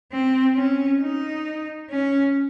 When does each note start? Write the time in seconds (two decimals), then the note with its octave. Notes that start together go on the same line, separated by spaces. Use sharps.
0.12 C4
0.56 C#4
1.02 D#4
1.91 C#4